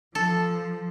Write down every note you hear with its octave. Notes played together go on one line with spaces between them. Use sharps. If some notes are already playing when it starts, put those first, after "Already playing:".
F3 A4